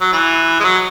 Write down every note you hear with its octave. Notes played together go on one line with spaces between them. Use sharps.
F#3
E3
G#3
F#3